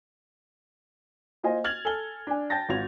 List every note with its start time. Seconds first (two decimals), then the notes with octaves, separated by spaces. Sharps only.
1.43 A#3 F4 C5 D#5 G#5
1.64 F6 G#6 A6 F7 F#7
1.85 A4 G#5 G7
2.27 D4 G#5
2.50 G5 A5 G6 A6 A#6
2.69 G#1 F4 F#4 G#6 F7